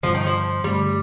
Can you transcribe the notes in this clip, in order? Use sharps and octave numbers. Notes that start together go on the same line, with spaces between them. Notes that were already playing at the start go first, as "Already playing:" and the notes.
G2 D3 F3 G3 C4
D#3
F3
G2 D3 G3 A3 C4